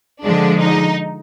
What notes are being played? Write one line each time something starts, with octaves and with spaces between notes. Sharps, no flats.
D3 F3 G#3 D4
D#4